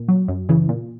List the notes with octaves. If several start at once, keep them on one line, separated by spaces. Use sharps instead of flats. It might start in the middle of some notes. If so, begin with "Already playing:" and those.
Already playing: A#2
F#3
F#2
C#3 E3
A#2